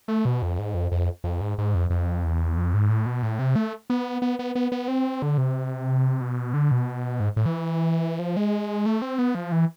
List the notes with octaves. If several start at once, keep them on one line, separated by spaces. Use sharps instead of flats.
A3
B2
F2
G#2
F2
F2
F2
G#2
G#2
F2
F2
E2
F2
G#2
A2
B2
A2
C3
A3
B3
B3
B3
B3
B3
C4
D3
C3
B2
D3
B2
G#2
A2
E3
F3
G#3
A3
C4
B3
F3
E3